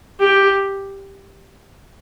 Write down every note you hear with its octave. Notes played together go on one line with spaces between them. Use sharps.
G4